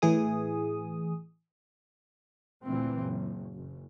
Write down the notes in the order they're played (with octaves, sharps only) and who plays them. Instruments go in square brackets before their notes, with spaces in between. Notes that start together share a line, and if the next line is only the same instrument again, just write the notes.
[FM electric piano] A2 E3 G#4 D#6
[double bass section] D2 A#2 E3 C4
F#1
F#1